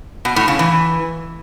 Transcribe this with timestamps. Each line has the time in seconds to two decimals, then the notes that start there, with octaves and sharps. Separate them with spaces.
0.25 B2
0.36 A2
0.48 C#3
0.59 E3